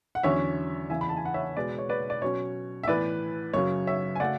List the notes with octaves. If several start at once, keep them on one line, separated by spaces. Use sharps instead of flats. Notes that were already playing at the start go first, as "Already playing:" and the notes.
F#5
E2 D3 F#3 C#4 C#5 E5
E2 C#3 E3 E5 G#5
B5
A5
G#5
F#5
C#5 E5
B2 G#3 B3 B4 D5
C#5
B4 D5
D5
B2 F#3 C#4 C#5
E5
A2 E3 B3 B4 D5
F#2 C#3 F#3 C#5
C#5 E5
G#5
C#3 F#3 A3 D5 F#5